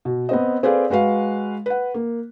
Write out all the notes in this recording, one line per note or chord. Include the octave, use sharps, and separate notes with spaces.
B2
B3 C4 D#5
C4 G#4 A4 B4 D5 F5
G#3 F#4 B4 F5
B4 F#5
A#3